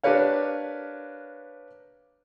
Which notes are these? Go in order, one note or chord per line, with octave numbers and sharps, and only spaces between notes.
D4 G4 A#4 B4 C#5 F5